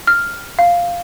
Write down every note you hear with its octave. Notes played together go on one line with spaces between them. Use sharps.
F6
F5